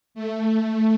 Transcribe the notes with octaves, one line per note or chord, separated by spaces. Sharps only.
A3